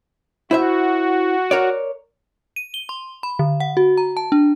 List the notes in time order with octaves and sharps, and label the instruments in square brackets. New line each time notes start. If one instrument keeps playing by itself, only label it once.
[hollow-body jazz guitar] E4 C5 E5 [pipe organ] F#4
[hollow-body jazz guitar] A#4 C#5 D5
[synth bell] D#7
G7
C6
B5
D3
F#5
F#4
A#5
A5
D4